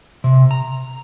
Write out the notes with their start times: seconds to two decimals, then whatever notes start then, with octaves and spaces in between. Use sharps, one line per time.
0.24 C3
0.51 A#5